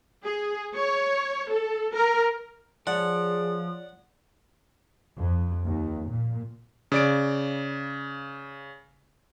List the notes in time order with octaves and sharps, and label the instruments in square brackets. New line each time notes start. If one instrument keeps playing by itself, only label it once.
[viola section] G#4
C#5
A4
A#4
[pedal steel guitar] F3 [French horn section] G#4 [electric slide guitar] C#5 D5 [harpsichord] F#5
[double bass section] F2
D#2
A#2
[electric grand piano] C#3 D5 D7